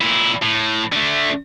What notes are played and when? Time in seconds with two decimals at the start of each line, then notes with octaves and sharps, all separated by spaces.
0.01 A#2 E4
0.42 A2
0.92 D3 A3